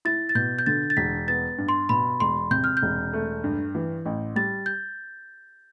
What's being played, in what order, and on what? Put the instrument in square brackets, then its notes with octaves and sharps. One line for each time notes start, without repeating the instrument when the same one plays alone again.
[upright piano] E4 [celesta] A6
[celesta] A6
[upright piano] B2 [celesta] G6
[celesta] G6
[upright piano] D3 [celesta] A6
[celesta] A6
[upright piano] E1 [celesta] B6
[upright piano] B3 [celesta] A6
[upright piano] G2
[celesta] C6
[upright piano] B2 [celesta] B5
[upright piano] E1 [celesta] C6
[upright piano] C3 [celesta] G6
[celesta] F6
G6
[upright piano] E1
A3
G2
E3
A1
[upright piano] G3 [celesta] A6
[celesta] G6